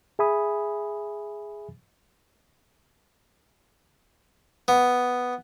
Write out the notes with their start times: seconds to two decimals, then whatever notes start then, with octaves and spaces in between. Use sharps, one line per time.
0.19 G#4 E5 G#5 B5 D#6
4.68 B3